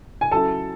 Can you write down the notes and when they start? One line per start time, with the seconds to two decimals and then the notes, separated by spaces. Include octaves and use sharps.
0.21 G#5
0.31 F#3 C#4 E4 A4 A5